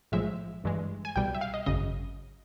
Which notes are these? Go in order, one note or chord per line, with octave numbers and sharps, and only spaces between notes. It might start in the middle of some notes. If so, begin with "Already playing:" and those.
B1 A2 F3 G#3 E5
G1 G2 E3 G#3
G#5
C2 B2 G3 G5
E5
F5
D#5
G#1 F#2 C#3 D#5